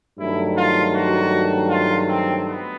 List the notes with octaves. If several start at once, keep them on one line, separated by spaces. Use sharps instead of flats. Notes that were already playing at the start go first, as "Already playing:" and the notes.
G2 D#3 F#3 A3 E4
F4
F#4
F4
C4
B3